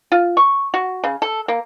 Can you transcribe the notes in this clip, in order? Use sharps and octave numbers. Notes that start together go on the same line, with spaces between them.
F4
C#6
F#4
C#3
A4
A#3